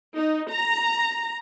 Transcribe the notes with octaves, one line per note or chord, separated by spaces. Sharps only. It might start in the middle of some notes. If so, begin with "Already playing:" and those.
D#4
A#5